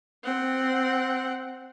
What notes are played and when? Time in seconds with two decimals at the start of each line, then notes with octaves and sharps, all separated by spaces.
0.24 C4 F#5